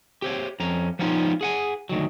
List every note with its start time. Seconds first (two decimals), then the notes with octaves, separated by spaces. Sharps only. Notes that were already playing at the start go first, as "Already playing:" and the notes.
0.22 G4 C5 C#5
0.60 F2 C#4 A#5
0.99 F3 G3 B3 C#4 D#4 F4
1.41 G#4 F#5 G#5
1.89 D2 D#3 F#3